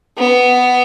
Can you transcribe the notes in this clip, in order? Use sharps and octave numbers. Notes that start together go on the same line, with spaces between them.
B3